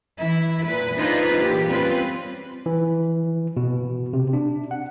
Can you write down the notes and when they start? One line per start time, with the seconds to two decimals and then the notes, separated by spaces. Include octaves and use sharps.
0.19 E3 E4
0.66 A#2 B4
0.96 D4 D#4 F4 G#4 B4 C5
1.37 A#2 E3 G4
1.69 G3 C4 C#4 F4 B4
2.66 E3
3.57 B2
4.13 C3
4.33 D4
4.71 F#5